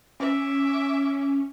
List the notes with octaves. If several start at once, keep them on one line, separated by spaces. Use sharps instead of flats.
C#4 E5 D6